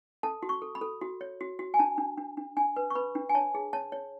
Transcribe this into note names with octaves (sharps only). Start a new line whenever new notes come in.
A4 A5
F#4
C#6
A4
B5
A4
F#4
C#5
F#4
F#4
G#5
D4 A5
D4
D4
D4
D4 G#5
B4
C#6
B4 B5
D4
G#5
C#5 A5
G#4
C#5 A5
C#5